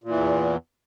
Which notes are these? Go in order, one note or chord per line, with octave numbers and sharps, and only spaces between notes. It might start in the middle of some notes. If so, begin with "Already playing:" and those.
E2 A#2 E3